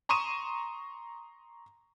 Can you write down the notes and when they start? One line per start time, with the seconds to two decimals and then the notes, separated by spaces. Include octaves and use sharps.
0.09 A#5 C6 C#6 D#6 D#7 E7